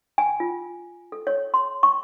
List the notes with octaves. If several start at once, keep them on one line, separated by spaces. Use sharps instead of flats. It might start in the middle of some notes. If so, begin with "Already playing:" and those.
G#5
F4
A4
C#5
C6
C#6